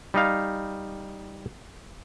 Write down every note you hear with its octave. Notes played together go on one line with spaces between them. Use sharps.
G3 D#4 F5